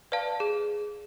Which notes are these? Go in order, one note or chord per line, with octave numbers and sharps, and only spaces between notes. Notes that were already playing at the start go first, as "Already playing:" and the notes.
B4 D5 F5 A5
G#4